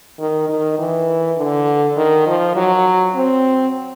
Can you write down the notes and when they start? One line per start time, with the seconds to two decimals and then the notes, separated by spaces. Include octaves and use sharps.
0.19 D#3
0.49 D#3
0.79 E3
1.37 D3
1.97 D#3
2.27 F3
2.56 F#3
3.15 C4